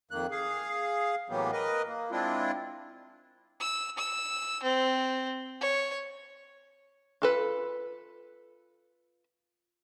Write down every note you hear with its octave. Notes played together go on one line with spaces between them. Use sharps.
F2 D#3 A#3 F#6
G#4 F5
A2 E3 F#3 A#3 B3 G4
A#4 B4 D#5
A#3
G#3 C4 D4 E4 F4
E6
E6
C4
C#5
F4 A4 B4